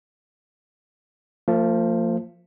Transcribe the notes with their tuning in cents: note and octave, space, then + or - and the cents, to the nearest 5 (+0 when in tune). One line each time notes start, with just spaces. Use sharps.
F3 +0 A#3 -45